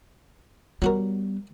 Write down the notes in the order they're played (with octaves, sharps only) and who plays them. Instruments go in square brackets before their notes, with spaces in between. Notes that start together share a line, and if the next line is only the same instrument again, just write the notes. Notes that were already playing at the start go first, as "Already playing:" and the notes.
[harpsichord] F#3 F#4 A#4 [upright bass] G3 B3